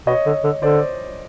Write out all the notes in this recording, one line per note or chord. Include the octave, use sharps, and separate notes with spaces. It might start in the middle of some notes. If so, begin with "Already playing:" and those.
B2 C#5 D#5
D3
D3
D3 C5 D5